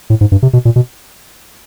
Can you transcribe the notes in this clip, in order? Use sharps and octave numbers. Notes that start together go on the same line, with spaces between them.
A2
G#2
G2
C3
B2
A#2
B2